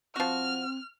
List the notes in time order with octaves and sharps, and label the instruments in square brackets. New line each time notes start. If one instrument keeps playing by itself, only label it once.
[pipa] F3 F#4 [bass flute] C4 [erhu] F6